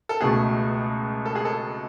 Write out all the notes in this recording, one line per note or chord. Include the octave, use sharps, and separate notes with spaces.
A4
C#2 B2 A3 G#4
A4
G#4
A4